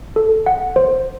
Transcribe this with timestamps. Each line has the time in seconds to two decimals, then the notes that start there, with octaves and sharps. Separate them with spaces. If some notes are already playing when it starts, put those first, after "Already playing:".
0.16 A4
0.46 F#5
0.76 C5